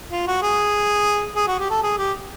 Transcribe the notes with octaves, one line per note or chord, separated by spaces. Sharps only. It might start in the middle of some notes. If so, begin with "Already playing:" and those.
F4
F#4
G#4
G#4
F#4
G4
A4
G#4
G4